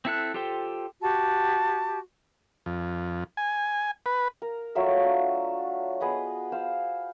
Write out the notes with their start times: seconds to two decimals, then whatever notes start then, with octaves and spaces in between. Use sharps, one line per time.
0.05 C4 E4 A4 F#6
0.34 F4 G4 A4 C5 G5
1.01 F#4 G4 A5
2.66 F2
3.37 G#5
4.06 B4
4.42 A#4
4.75 F#3 A3 F4 E5
5.03 D4
6.00 B3 G#4 B4 D#5
6.52 C5 F5 E6